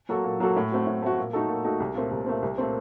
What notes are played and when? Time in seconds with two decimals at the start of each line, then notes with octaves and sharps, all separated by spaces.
0.09 F#3 A#3 F#4 A4
0.24 A#2
0.40 F#3 A#3 F#4 A4
0.56 A2
0.72 A3 C4 F#4
0.87 A2
1.02 A3 C4 F#4
1.18 A#2
1.33 A3 D#4 F#4 A4
1.49 A#2
1.64 A3 D#4 F#4 A4
1.80 C2
1.95 A#2 A3 C4
2.11 C2
2.26 A#2 A3 C4
2.42 C2
2.58 A#2 A3 C4